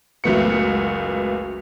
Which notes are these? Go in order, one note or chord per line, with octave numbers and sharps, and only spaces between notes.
F#1 C#2 F#3 A3 B3 C#7